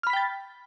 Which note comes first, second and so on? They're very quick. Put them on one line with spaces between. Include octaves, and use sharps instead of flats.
F6 B5 B6 G5 A6